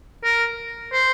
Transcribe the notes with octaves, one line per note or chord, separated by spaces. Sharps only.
A#4
C5